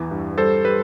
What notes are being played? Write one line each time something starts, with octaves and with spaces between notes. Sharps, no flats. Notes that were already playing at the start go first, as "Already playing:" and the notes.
Already playing: E2 E3
G2
G3 A4 C5
G3 B4